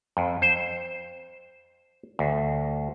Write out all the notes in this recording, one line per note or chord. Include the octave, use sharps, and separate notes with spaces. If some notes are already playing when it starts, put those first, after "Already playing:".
F2
C5
D2